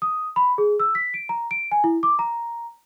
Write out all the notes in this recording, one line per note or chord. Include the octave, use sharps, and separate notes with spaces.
D#6
B5
G#4
E6
B6
D7
A#5
D7
G#5
E4
D6
A#5